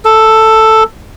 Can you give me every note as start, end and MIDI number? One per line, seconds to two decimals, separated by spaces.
0.05 0.83 69